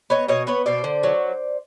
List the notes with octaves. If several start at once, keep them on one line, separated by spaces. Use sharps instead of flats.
B3 C#5 D#5
B2 C#5 D#5
B3 B4 C#5
B2 C5 D5
D3
F#3